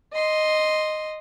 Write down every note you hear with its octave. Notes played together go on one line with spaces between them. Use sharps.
D#5 C6